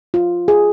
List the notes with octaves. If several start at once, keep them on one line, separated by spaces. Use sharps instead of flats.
F4
G#4